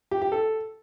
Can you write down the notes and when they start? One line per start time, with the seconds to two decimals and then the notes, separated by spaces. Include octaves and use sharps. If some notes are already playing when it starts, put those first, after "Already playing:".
0.11 G4
0.22 G4
0.32 A4